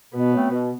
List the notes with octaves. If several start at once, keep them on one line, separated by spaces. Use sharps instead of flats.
B2 B3
F#3 A3 C4
B2